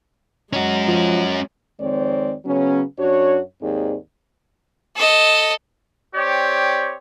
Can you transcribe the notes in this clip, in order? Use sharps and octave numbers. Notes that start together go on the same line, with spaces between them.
F#3 G#3 C#4 F#4 D#5 A#5
F3
F2 D#3 G#3 C4 C#5 D5
C#3 F#3 B3 C#4
F#2 D4 F#4 C#5
D#2 G#2 D#3 C4 G#4 D5
A4 D#5
C4 G4 C#5 D5